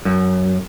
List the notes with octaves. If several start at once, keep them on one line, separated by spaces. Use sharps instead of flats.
F#2